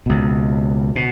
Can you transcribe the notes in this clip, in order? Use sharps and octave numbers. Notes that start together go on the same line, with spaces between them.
C#2 B2
B2